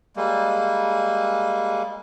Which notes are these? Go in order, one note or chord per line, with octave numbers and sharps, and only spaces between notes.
G3 G#3 A#3